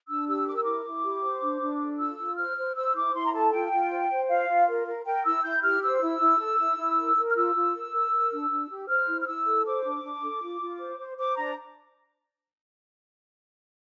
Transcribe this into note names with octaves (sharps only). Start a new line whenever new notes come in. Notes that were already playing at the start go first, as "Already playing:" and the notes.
D4 E6
G4 E6
A#4 D6
E6
E4 D6
E4
G4
C5
D4
D4
A4
F4 E6
F4
C5 F6
C5
C5 E6
E4 D6
E4 C6
A#5
A4 A5
F4 G5
F4
C5
C5
F4 F5
F4
A#4
A#4
A#4 G5
E4 E6
E4 G6
G4 F6
C5 E6
E4
E4
A4
E4
E4
A#4
A#4
F6
F4 E6
F4
A#4
A#4
A#4
D4
D4
G4
C5 F6
E4
F6
E4 E6
A4
C5 D6
D4
D4
A4
F4
F4
C5
C5
C5 D6
D4 A#5